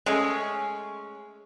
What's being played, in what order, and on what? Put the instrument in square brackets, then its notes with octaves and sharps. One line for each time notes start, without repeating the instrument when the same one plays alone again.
[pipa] G#3 A3 C#4